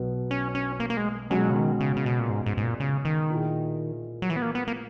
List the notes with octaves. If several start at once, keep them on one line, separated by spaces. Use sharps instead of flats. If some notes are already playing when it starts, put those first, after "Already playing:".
Already playing: B1 B2 F#3 B3
C#4
C#4
A#3
A#3
G#3
B2 F#3 G#3 C#4 G#4
C#3
D#3
C#3
C#3
B2
A#2
G#2
G#2
G#2
A#2
C#3
D#3
A#2 A#3 E4 G#4
F#3
E3
B3
A#3
B3
A#3